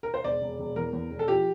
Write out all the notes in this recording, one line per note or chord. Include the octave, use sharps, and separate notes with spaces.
A#4
C5
E1 D5
E1
E1
E2 A#4
E2
E1
A4
F3 G4